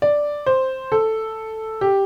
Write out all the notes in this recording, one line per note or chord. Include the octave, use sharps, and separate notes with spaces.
D5
C5
A4
G4